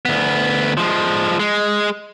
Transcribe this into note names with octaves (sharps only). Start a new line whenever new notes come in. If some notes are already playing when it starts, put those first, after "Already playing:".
D2 B3
F3 G#3
G#3